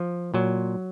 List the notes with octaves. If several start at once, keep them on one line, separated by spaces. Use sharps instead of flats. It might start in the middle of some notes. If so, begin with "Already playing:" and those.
Already playing: F3
A#2 F#3